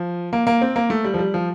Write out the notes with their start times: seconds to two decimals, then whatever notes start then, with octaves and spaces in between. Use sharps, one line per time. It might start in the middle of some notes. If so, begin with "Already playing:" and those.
Already playing: F3
0.33 A#3
0.47 A#3
0.62 C4
0.76 A#3
0.90 A3
1.04 G3
1.14 F3
1.19 G3
1.34 F3